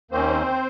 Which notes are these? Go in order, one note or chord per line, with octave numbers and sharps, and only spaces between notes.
D#2 D#3 A#3 C4 C#4 C5